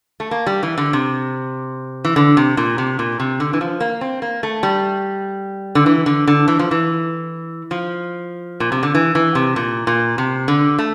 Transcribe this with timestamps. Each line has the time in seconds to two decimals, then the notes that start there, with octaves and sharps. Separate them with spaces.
0.20 A3
0.31 A#3
0.46 G3
0.63 E3
0.78 D3
0.93 C3
2.05 E3
2.16 D3
2.37 C3
2.57 A#2
2.78 C3
2.99 A#2
3.20 C3
3.40 D3
3.53 E3
3.61 F3
3.80 A#3
4.01 C4
4.22 A#3
4.43 A3
4.63 G3
5.75 D3
5.86 E3
6.06 D3
6.27 D3
6.48 E3
6.59 F3
6.71 E3
7.71 F3
8.60 A#2
8.72 C3
8.83 D3
8.95 E3
9.15 E3
9.35 C3
9.56 A#2
9.87 A#2
10.18 C3
10.48 D3
10.79 A3